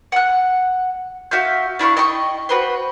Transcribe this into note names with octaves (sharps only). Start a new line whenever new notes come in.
F#5 F#6
F#4 E5 F5 G6
D4 E4 F5 C#6
D#5 G5 C6 C#6
F#4 B4 C5